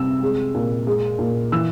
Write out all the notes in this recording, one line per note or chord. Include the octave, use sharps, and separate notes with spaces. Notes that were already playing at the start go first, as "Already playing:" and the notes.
Already playing: C3 G3 E6
G#3
A#2
G#3
A#2
E3 E6